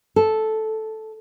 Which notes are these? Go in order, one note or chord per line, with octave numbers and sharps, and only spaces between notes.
A4